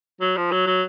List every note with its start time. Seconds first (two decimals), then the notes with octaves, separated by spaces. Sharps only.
0.21 F#3
0.37 F3
0.51 F#3
0.67 F#3